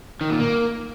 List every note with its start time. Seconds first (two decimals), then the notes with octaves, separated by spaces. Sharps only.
0.21 D#3
0.30 A#2
0.40 A#3